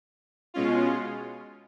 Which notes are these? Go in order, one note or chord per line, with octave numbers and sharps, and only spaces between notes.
B2 G#3 C#4 F4